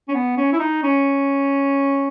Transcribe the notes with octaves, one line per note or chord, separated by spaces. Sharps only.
C#4
B3
C#4
E4
D#4
C#4